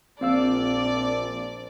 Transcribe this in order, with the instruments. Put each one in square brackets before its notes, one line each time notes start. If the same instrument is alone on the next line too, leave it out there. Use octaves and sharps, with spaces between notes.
[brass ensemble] A#1 [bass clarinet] F3 [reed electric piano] C4 F5 E6 [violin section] D5